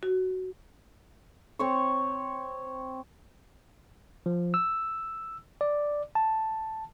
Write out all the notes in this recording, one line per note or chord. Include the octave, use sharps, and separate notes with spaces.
F#4
C4 C#5 C#6
F3
E6
D5
A5